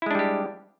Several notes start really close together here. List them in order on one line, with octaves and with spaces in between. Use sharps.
E4 G#3 D4 G3 G4